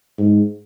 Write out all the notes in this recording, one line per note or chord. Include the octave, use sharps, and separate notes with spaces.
G#2